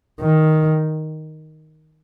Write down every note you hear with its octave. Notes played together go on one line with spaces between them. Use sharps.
D#3